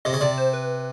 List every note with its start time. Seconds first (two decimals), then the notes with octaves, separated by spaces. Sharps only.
0.05 C3 D#5
0.13 C#3
0.21 C3 D5
0.38 C5
0.53 B4